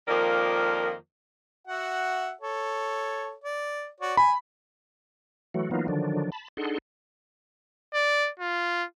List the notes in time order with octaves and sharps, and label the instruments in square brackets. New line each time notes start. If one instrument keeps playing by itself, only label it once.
[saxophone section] F2 D#3 F3 A#3 A#4 D5
[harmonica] F#4 E5 F#5
A4 C#5
D5
F#4 C#5 D5
[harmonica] G#5 [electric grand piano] B5
[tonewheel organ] E3 F#3 A3 F#4
E3 F#3 A#3 B3 D#4 F4
D3 D#3 F3 F#3 D4
A5 B5
D4 D#4 G#4 A4 F#5 C6
[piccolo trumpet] D5
F4